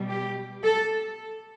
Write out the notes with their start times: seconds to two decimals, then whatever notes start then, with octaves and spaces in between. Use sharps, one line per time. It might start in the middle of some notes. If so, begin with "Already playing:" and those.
Already playing: B2 G3
0.08 G4
0.63 A4